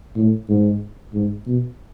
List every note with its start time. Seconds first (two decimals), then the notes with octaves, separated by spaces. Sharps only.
0.16 A2
0.49 G#2
1.14 G#2
1.47 B2